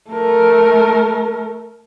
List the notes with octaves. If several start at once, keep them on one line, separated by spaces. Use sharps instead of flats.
A3 A#4